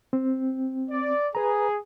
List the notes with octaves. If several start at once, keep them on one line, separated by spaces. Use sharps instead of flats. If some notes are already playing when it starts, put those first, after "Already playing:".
C4
D5
G#4 B4 A#5